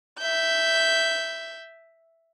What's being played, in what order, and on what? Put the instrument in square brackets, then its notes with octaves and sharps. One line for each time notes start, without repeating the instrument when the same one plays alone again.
[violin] E5 G6